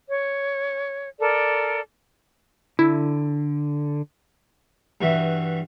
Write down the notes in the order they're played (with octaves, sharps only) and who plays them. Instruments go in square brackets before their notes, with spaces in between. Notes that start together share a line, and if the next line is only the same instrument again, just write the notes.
[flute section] C#5
A4 A#4 D5
[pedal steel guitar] D3 [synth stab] E4
[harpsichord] G2 E3 F#4 E5